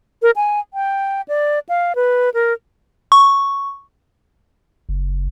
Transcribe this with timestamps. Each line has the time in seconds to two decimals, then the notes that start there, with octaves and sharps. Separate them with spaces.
0.22 A#4
0.36 G#5
0.74 G5
1.28 D5
1.69 F5
1.95 B4
2.34 A#4
3.12 C#6
4.89 F#1